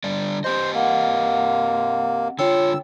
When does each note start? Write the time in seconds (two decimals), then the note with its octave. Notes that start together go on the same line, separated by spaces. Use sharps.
0.04 D3 G3 D5
0.44 C4 G4 C5 D#5
0.75 A#3 F#5
2.39 D3 F4 C#5 G5 E6